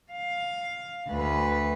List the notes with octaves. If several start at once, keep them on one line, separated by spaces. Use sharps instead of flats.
F5
D2 B4